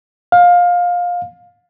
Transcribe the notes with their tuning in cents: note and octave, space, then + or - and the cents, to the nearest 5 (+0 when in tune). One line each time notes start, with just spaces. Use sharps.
F5 +20